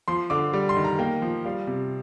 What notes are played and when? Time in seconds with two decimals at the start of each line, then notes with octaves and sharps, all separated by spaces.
0.08 F3 C6
0.30 D3 D6
0.53 G3
0.69 C6
0.77 D#3
0.84 A#5
0.99 A#3 G5
1.22 F3
1.45 G3 F5
1.67 C3